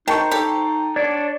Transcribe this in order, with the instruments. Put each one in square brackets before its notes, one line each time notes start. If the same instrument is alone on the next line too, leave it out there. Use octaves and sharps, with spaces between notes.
[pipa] D#3 [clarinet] D#4 [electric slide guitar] C5 [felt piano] G5 A5 C#6
[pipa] G4 A4
[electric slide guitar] D4 C#5 D5